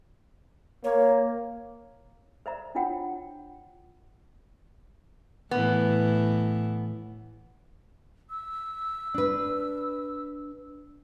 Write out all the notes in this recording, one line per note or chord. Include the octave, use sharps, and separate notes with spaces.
A#3 C#5
C5 D5 E5 F5 A#5
D4 E4 F4 C#5 F#5 G5
A2 E3 B3
E6
D4 B4